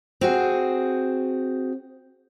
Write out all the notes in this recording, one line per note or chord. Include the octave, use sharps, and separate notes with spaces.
C4 F#4 G#4